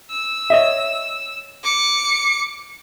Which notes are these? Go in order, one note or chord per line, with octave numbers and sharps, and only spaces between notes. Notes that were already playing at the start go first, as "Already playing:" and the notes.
E6
C#5 D#5 E5
D6 C#7